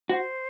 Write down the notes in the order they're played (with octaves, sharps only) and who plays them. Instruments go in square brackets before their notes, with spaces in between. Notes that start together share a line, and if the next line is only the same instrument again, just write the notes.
[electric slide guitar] F#4 [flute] C5